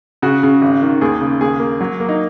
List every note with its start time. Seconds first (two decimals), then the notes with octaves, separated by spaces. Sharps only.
0.22 C#3 F#4
0.43 C#3
0.62 G#1
0.82 D#3
1.01 D#2 G#4
1.21 C#3
1.40 D#2 G#4
1.60 A#3
1.81 F#3
2.00 A#3
2.09 D#4